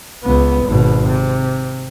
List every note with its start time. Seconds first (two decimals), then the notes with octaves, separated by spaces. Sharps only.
0.24 C#2 B3
0.66 G#1 B2
1.08 C3